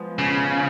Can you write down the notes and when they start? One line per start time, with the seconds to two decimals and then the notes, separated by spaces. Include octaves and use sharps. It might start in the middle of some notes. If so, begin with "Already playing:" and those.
Already playing: F3 G#3 B3
0.19 C#3